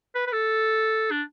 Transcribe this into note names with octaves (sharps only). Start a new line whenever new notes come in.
B4
B4
A4
D4